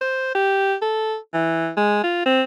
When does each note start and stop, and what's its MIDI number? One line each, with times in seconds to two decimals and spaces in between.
0.01 0.33 72
0.35 0.74 67
0.82 1.16 69
1.34 1.70 52
1.77 1.99 56
2.03 2.23 65
2.26 2.42 60